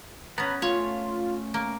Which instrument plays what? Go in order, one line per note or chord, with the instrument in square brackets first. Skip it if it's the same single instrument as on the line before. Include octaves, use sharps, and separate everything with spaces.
[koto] B3 C#4 [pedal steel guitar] B4 F#5 A#5
[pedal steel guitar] A3 C#4 [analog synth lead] F4 [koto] C#5
[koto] A#3